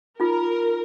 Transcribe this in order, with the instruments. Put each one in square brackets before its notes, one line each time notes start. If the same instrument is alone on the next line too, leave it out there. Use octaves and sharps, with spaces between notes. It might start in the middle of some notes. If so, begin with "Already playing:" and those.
[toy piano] D#4 F4 [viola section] A#4